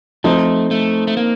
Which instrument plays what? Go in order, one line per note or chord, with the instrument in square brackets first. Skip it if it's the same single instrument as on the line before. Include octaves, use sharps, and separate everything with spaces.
[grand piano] F3 C4 D#4 [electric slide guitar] A3
[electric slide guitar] A3
A3
A#3